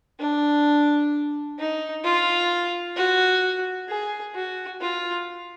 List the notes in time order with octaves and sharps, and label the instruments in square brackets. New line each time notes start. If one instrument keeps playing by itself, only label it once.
[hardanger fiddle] D4
D#4
F4
F#4
G#4
F#4
F4